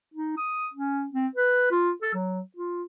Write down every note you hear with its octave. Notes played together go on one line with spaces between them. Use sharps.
D#4
D#6
C#4
C4
B4
F4
A4
F#3
F4